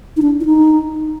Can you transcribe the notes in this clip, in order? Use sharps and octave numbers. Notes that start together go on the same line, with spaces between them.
D#4
D4
E4
D#4